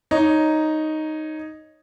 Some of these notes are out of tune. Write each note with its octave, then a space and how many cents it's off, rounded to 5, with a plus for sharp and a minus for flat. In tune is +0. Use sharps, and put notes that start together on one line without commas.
D#4 +0 C#5 +0